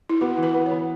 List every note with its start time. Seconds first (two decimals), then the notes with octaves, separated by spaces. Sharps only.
0.09 E4
0.21 B3 F#4
0.37 E3
0.43 B4
0.54 B3
0.66 C#5
0.71 B3